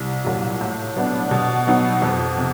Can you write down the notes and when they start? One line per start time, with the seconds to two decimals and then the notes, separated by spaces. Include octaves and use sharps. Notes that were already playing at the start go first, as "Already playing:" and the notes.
Already playing: C2
0.24 A#2 F#3
0.61 A2
0.96 F#3 B3 D4
1.31 B2
1.67 F#3 B3 D#4
2.02 F2
2.38 C3